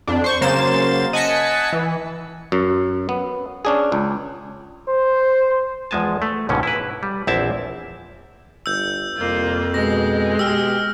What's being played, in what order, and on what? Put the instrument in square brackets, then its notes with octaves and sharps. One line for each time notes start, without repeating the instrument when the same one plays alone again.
[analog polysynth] F2 D4
C5 C#6
C#3 F#3 A#3 C5 A6 E7
D#5 F#5 G#5 A5 B6 C#7
E3
[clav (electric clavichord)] F#2
B3
C#4 D4 G#4
C#2
[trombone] C5
[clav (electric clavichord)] E2 F3 G#3 G#5 A5
A3
C#2 G#2 B2 D3 D#3 C#4
E4 G#4 B4
G3
A#1 E2 C4 E4 E5 A5
[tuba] G1 [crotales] E6 G6
[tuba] C2 [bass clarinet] F2 [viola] A#3 F4
[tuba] B2 [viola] G#3 [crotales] A#6
[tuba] B2 [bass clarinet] G4 [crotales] E6 F6